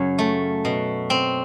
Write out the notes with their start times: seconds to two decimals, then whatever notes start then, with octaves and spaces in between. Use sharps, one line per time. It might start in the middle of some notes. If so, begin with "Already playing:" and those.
Already playing: F#2 C#3 F#3 C#5
0.19 A3
0.65 B2
1.10 C4